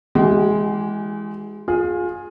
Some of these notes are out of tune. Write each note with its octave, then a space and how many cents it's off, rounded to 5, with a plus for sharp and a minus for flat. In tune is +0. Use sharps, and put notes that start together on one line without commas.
E3 +0 G#3 +0 G4 -45
F4 +25 G#4 +0